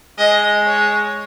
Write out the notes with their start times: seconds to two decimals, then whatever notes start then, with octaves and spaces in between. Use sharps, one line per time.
0.18 G#3 D#5
0.66 C#5